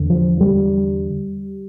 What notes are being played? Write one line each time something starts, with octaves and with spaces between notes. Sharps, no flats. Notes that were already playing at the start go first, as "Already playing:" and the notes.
Already playing: E2 D3
F3
G3